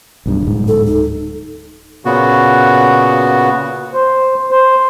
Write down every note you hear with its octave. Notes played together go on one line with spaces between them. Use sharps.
B1 G2
D1 G#2
A4
D#4
A#2 C#3 B3 F#4
C5
C5